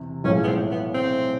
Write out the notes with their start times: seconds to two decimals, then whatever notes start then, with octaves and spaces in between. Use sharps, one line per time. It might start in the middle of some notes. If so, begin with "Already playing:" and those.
Already playing: E2 C3
0.24 B1 A2 F3 G#3 C#4
0.43 B3
0.47 C4
0.71 B3
0.94 C4